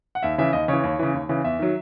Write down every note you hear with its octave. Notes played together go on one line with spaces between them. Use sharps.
F#5
D#2 E5
C#3 E3 E5
D#2 D#5
C#3 E3 C#5
D#2
C#3 E3
D#2
C#3 E3
E2 E5
D#3 F#3